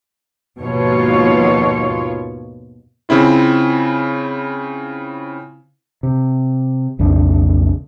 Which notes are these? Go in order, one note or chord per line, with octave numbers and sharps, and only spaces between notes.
D#2 G#2 B2 F3 F4 C#5
C#3 C4 E4 F4
C3
B1 F2 C#3 D4